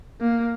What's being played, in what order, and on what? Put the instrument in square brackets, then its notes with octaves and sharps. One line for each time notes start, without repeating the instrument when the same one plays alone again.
[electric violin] A#3